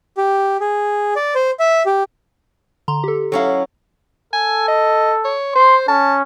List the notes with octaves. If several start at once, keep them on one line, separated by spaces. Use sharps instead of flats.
G4
G#4
D5
C5
E5
G4
D3 A#5 C6
G4 A4
F#3 C#4 E4 A4 F5
A4 G#5
D#5
C#5
C5 C6
C#4 A5